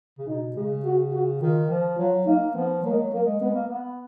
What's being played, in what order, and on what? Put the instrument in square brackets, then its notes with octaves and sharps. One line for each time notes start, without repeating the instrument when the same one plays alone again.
[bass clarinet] C#3
[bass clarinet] B2 [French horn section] D#4
[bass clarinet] C#3 [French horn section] G#3
[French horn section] F#4
F#4
[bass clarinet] D#3 [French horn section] F4
[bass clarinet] F3
[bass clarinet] F#3 [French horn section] F4
[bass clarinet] A#3 [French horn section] D#4
[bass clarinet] F3 [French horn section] B3
[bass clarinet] F#3 [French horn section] A#3
[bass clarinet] G#3
F#3
[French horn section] A#3
[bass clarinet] G#3
[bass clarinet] G#3 [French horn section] B3
[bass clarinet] A#3
B3